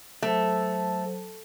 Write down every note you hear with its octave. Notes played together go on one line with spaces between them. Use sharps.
F#3 A3 C5 A5